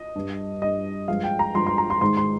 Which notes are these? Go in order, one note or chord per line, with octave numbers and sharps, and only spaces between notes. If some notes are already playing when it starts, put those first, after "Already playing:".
Already playing: D#5
G2 G3
G2 G3 D#5
G2 F3 G#3 F5
G5
A#5
G2 F3 G#3 C6
C6
A#5
C6
G#2 D#3 G#3 C6
C6